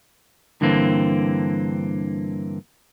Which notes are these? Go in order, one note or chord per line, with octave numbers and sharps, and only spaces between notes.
G2 D3 E3 A#3 C4